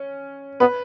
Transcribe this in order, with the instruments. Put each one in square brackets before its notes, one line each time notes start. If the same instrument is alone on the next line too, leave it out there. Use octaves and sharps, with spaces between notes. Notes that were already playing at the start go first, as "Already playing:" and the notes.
Already playing: [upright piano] C#4
[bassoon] B3 [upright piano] B4